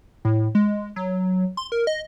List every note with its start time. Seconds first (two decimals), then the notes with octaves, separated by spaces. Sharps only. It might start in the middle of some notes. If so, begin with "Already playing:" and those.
0.25 A2
0.55 G#3
0.96 F#3
1.57 C6
1.72 A#4
1.87 D#5